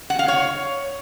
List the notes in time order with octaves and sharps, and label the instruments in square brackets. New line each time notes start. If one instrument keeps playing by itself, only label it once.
[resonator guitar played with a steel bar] F#5
F5
C#5